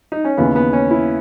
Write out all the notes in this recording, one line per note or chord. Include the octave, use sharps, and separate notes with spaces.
D#4
C#4
D#2 C#3 E3 B3
B3
C#4
E4